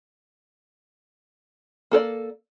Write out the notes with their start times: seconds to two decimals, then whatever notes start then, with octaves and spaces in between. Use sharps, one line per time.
1.91 A#3 A4 A#4 D5